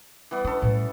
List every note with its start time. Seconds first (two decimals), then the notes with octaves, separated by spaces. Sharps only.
0.31 E3 G3 B3
0.45 B3 C#4 D4 A4
0.62 A2 G3